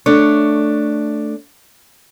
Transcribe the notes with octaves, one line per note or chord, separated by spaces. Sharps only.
A3 D4 C#5